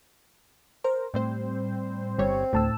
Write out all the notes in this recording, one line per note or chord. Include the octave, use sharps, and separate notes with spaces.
A#4 C5
A2 G3 C4 C5
G1 G3 C4 C#5
D2 A2 D3 A5 E6